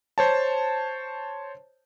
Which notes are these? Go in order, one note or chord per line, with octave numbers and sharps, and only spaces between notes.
C5 C#5 A5